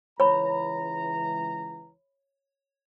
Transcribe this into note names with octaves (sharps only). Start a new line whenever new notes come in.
C#2 E3 C#5 A#5 B5